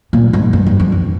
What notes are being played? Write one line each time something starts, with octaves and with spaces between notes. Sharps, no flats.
A#2
G#2
G2
G2
F2
F2